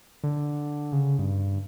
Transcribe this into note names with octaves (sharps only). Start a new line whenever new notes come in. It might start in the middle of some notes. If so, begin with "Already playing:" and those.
D3
C#3
G2